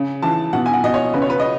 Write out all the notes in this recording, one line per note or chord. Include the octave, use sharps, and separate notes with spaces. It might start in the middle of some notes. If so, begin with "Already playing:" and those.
Already playing: C#3
E3 A5
B2 F#5
G#5
F#5
B2 D#5
C#5
C#3 B4
C#5
B4
D#5